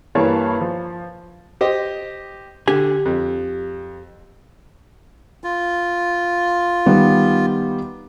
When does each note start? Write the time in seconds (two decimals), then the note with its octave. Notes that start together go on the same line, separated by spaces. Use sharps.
0.15 G2 E3 A#3 C#5 A5 B5
0.61 F3
1.61 G4 C5 D#5
2.68 D3 G4 G#5
3.05 F2
5.44 F4
6.86 D#3 G3 B3